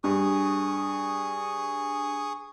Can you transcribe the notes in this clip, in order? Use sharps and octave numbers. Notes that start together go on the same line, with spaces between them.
G2 G#4 C#6 D#6